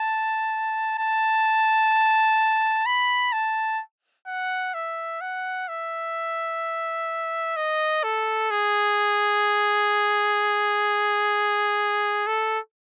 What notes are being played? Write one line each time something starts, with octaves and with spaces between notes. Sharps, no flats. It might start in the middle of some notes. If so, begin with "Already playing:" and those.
Already playing: A5
A5
B5
A5
F#5
E5
F#5
E5
D#5
A4
G#4
A4